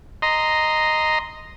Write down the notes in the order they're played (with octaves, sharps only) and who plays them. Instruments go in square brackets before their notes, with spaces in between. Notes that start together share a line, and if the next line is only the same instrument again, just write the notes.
[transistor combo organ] D#5 A#5 C6